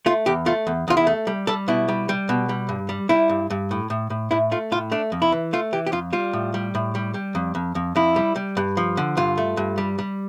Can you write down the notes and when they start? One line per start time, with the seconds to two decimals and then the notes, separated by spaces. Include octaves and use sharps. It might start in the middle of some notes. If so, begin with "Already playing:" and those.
0.06 A3 F4
0.26 E2 G4
0.46 A3 F4
0.67 E2
0.88 E2 F4
0.97 E4
1.07 A3
1.27 G3
1.47 G3 A4
1.68 B2 E4
1.88 G3
2.09 G3
2.29 B2
2.49 G3
2.69 G2
2.89 G3
3.09 G3 E4
3.29 G2
3.50 G2
3.71 A2
3.90 A2
4.10 A2
4.31 A2 E4
4.52 A3 F4
4.72 A2 F4
4.92 A3 D4
5.12 F2
5.22 E4
5.32 E3
5.53 A3 F4
5.73 E3 G4
5.87 G4
5.92 F2 F4
6.13 G3 F4
6.33 A2
6.54 G3
6.75 A2
6.95 G3
7.14 G3
7.35 F2
7.55 F2
7.75 F2
7.96 F2 E4
8.16 G3
8.36 G3
8.57 G2
8.77 F3
8.97 D3
9.17 G2 F4
9.38 A3
9.57 G2
9.78 G3
9.99 G3